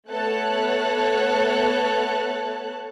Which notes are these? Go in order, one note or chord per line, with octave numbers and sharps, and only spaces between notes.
A3 B3 A4 C#5 A5 F#6